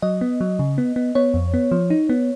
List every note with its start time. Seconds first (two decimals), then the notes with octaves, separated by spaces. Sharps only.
0.02 F#3 D#5
0.21 B3
0.41 F#3
0.59 C#3
0.78 B3
0.96 B3
1.15 B3 C#5
1.34 F2
1.54 B3
1.71 F3
1.90 D#4
2.09 B3